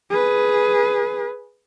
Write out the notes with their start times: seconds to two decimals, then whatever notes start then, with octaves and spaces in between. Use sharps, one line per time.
0.10 G#4 B4